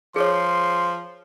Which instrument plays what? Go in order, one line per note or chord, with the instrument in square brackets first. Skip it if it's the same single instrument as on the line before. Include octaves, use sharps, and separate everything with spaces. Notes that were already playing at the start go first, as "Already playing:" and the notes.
[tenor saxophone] F3 [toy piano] G#4 C#5 [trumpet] C6